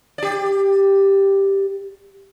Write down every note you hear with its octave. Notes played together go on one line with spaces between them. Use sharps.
G4 D5